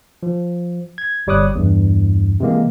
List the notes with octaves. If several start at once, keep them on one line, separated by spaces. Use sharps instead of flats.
F3
G#6
G1 G3 C#5 D6 D#6 F#6
E2 G2
C3 E3 G#3 A#3